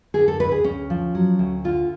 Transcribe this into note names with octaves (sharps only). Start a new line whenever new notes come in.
D3 G#4
A4
D2 B4
G#4
D2 C#4
F3
F#3
D2
D3 F4